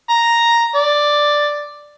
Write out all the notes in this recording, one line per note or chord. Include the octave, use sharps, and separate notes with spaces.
A#5
D5